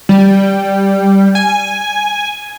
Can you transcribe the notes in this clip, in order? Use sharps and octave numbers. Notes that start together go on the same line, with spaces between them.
G3
G#5